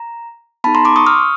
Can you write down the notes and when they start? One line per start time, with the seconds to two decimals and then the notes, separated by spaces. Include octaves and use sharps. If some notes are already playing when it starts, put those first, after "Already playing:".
Already playing: A#5
0.64 B3 D#4 G#4 A5 B5
0.75 A#5 C6
0.85 C6 D6
0.96 C#6 D#6
1.06 D#6 F6